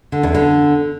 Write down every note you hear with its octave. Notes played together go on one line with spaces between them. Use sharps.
D3
E2
D3